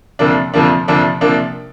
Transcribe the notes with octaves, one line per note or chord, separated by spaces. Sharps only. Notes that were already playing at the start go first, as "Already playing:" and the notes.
F2 C3 F3 A#3 D4
F2 C3 F3 A#3 D4
F2 C3 F3 A#3 D4
C3 F3 A#3 D4